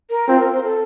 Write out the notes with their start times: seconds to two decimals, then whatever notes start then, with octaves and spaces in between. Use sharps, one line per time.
0.10 A#4
0.28 C4 F4
0.40 A#4
0.52 C5
0.63 A4